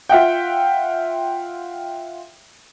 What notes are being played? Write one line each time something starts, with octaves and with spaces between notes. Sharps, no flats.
F4 E5 F#5 G5